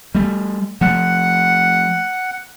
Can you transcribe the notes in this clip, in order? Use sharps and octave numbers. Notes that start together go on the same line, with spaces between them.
G3 A3
F3 A3 F#5